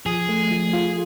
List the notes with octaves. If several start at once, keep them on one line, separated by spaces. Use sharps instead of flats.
F3 G#4
A3
F3
F4